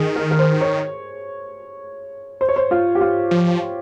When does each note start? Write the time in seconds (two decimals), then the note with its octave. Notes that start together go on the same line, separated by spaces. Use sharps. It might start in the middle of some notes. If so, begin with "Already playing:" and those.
Already playing: D#3 G#4
0.16 A#4
0.31 A#4
0.39 C5
0.61 C#5
2.41 C5
2.49 C#5
2.56 C5
2.71 F4
2.95 G4
3.01 F4
3.31 F3